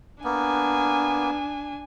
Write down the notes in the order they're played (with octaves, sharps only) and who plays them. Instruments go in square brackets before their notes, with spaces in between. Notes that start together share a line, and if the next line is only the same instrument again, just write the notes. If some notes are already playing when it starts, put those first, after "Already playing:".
[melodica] A#3 B3 [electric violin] D4 G#5